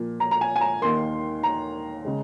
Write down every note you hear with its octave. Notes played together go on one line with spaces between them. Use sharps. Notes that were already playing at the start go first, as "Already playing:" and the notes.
Already playing: A#2 F3 A#3
A#5
A#5
G#5
G#5
A#5
D#2 D#3 A#3 C6
A#5
C#3 G#3